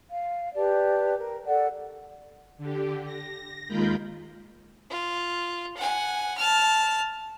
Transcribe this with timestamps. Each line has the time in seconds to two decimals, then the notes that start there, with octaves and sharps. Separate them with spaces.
0.10 F5
0.55 G4 B4 D5 A5
1.18 A#4
1.47 A4 D5 F#5
2.58 D3 G4
3.05 A#6
3.68 D#2 G#3 F4 A#4 B5 G6
4.90 F4
5.77 F#5 G#5
6.38 A5 F6